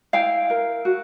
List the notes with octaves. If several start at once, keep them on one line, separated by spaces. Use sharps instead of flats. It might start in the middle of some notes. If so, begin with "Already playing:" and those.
E4 F5 G5
A#4
F#4